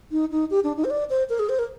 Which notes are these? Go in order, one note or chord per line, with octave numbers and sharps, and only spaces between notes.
D#4
D#4
G4
D4
D#4
C5
D5
C5
A#4
G#4
C5
A#4